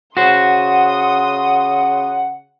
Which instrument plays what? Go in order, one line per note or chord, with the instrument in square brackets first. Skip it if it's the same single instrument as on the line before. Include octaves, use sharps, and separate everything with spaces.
[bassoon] C#3 [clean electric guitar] F#4 C5 [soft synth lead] F#5 [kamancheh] C6 D#6